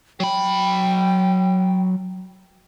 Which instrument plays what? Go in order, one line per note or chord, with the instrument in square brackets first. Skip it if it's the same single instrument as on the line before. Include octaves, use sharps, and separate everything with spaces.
[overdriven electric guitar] F#3 B5 [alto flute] G5